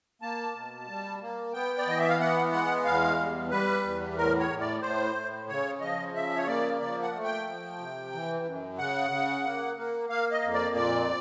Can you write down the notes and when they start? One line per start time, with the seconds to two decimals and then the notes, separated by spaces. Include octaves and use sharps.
0.22 A#3 A5
0.55 B2
0.88 G3
1.21 A#3
1.53 B3 G5
1.78 D5
1.87 E3 D#5
1.99 E5
2.09 F5
2.19 B3 F#5
2.52 G#3 F#5
2.85 E2 F5
3.18 G3
3.51 G3 B4
3.83 E2
4.17 A2 A#4
4.39 C#5
4.50 A2
4.61 D5
4.82 A2 C5
5.15 A2
5.48 C#3 C#5
5.81 F3 D#5
6.15 C#3 E5
6.36 C#5
6.47 A#3 D5
6.80 F3 D5
7.03 F#5
7.13 A3
7.24 G5
7.46 F3
7.79 C3
8.13 E3
8.45 F#2
8.78 C#3 F#5
9.11 C#3
9.44 A#3
9.77 A#3
10.09 A#3 F5
10.31 D#5
10.43 F2
10.53 D5
10.76 A#2 D5